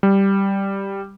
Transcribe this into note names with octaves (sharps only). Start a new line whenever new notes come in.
G3